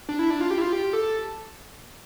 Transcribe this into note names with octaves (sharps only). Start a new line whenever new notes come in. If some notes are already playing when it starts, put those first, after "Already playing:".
D4
E4
D4
F4
G4
E4
F4
G4
A4